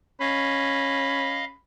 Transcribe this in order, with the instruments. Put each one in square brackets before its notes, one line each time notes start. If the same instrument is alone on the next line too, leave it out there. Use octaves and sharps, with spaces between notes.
[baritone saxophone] C#4 [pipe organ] D#5 F5 [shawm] B5